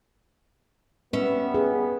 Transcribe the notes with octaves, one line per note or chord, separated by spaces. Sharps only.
G3 B3 C#4 B4 E5
G#4